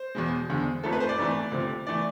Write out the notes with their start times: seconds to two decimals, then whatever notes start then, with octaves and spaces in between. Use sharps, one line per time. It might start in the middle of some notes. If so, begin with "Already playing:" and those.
Already playing: C5
0.15 E2 B2 G#3
0.49 E2 D3 G#3
0.83 G#1 G#2 F3 A3 A4
0.93 B4
1.00 C5
1.09 D5
1.18 G#1 G#2 E3 A3
1.52 D2 C3 F3
1.87 E3 A3 D5